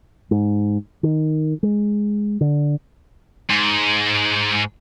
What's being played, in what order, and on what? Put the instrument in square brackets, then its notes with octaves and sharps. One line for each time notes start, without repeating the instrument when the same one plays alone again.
[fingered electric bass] G#2
D#3
G#3
D3
[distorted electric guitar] G#2